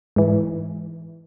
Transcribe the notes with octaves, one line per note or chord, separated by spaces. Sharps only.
G#2 E3